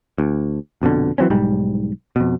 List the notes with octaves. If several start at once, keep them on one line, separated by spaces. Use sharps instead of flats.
D2
A#1 F2 B2 D3
E3 F#3 C4 C#4
B1 G#2 G3
F2 B2